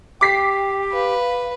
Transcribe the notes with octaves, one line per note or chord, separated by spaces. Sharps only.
G4 G5 D6 B6 C7
B4 F5